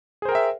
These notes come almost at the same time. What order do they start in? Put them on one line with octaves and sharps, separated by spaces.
G#4 C5 A#4 G5 E5